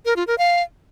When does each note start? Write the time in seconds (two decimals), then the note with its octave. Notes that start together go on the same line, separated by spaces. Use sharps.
0.05 A#4
0.16 F4
0.27 A#4
0.38 F5